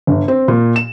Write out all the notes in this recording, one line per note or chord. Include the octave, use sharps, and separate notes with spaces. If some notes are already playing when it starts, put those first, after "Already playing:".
G1
C4
A#2
E7